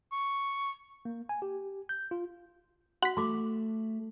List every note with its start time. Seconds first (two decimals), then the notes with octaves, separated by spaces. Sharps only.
0.12 C#6
1.05 A#3
1.29 G#5
1.42 G4
1.89 G6
2.11 F4
3.03 F#4 F#5 B6
3.17 A3 F#4 D6